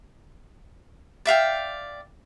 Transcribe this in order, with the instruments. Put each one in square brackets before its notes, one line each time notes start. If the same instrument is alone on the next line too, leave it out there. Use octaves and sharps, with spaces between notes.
[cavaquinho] D5 E5 F5 G5